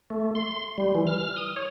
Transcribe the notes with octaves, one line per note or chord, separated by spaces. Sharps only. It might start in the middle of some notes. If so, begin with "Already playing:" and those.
A3
C6
G3
E3
F6
D#6
C#5